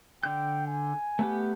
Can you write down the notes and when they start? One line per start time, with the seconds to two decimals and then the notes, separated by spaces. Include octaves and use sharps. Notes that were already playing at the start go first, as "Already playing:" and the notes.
0.23 D3 G5 G6
0.67 G#5
1.19 A3 B3 G4